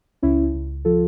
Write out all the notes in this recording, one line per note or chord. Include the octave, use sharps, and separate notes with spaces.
C#2 C#4 E4
C#2
F3 F4 A4